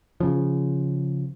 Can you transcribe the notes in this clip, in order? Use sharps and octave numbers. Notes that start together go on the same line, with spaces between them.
C#3 F3